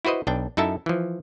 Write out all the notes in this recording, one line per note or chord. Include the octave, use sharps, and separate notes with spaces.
E4 F#4 B4 C5 D#5
B1 D4 G5
F#2 D#4 E4 A4 E5 A5
E3 F3